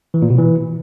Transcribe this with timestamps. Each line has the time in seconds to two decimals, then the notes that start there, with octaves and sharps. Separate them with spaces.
0.14 E3
0.22 A#2
0.30 B2
0.38 E3